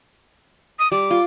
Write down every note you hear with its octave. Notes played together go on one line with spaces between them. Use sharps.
D#6
G3 D6
F4